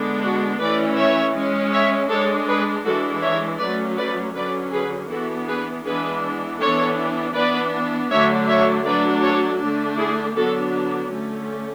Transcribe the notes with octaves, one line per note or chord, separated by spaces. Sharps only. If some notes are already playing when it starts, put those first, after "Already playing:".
Already playing: D3 G#3 B3 D4
F#4
E3 A3 C#4 B4 D5
C#5 E5
G#3 C#4
C#5 E5
G#3 D4 A4 C#5
G#4 B4
E3 G#3 D4 F#4 A4
C#5 E5
F#3 A3 C#4 B4 D5
B4 D5
D3 F#3 C#4 B4 D5
G#4 B4
E3 B3 D4 F#4 A4
G#4 B4
E3 G#3 B3 D4 G#4 B4
E3 B3 D4 A4 C#5
E3 B3 D4 B4 D5
D3 F#3 A3 D4 C#5 E5
C#5 E5
F#3 A3 D4 B4 D5
A4 C#5
D3 A3 D4
E4 G#4
D3 F#3 B3 D4 F#4 A4
D3 A3 C#4